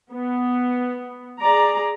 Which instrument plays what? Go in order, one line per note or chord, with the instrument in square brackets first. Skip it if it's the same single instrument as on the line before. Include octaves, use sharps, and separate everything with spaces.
[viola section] B3
G#4 D5 A#5